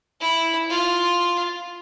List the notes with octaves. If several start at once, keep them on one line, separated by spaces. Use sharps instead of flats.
E4
F4